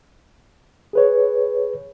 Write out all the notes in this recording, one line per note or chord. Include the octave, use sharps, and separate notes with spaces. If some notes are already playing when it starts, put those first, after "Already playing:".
G#4 B4 C#5